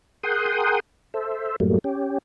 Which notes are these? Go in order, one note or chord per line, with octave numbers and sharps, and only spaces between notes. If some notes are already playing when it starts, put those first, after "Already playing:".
G#4 A#4 F#5 G5 C6 D#6
A4 C5 E5
F#2 A2 F#3 G3 A3 A#3
C#4 G4